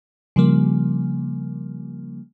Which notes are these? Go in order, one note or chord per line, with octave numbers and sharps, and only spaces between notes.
C#3 F3 G3 A#3